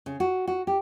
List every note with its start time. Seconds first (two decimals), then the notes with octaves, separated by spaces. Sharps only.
0.06 C#3
0.20 F#4
0.47 F#4
0.67 G4